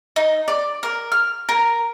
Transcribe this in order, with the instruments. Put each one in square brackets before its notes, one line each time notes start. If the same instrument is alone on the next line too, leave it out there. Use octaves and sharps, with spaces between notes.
[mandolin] D#4
D5
A#4
F6
A#4